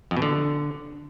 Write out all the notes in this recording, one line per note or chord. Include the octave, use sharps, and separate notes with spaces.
F2
B2
D3